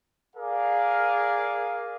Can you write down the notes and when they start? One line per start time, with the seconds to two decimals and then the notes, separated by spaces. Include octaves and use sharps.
0.36 G#4 A#4 D5 F5